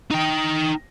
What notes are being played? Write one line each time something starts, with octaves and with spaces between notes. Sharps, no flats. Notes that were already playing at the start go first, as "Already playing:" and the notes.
D#4 G5